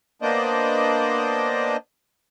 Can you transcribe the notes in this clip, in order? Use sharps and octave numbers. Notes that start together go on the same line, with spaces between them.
A#3 B3 D4 C5 D5 D#5